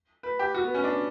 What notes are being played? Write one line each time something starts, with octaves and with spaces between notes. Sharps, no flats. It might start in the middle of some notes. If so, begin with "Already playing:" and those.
B4
G4
F#4
B3
C#4
D4